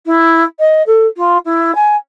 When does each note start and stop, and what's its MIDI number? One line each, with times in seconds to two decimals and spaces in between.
0.06 0.44 64
0.59 0.82 75
0.86 1.06 69
1.17 1.37 65
1.45 1.74 64
1.75 1.96 80